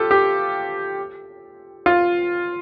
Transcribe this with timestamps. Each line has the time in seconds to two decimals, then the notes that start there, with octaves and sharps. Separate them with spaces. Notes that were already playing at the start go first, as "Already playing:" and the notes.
Already playing: F4 G4 A4
0.11 G4
1.86 F4